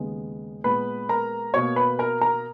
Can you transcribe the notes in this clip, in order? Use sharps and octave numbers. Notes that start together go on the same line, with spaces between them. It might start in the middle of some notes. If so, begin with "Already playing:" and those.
Already playing: D#2 C#3 G#3 B3
A#2 G#3 B3 B4 B5
A#4 A#5
B2 A#3 C#5 C#6
B4 B5
A#4 A#5
A#4 A#5